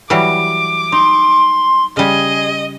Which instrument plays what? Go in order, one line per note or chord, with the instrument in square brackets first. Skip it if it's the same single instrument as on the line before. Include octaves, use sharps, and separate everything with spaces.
[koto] E3 F#3 G3 [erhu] D6
[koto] D#4 [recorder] C6
[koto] C#3 G3 [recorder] G#4 [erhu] D#5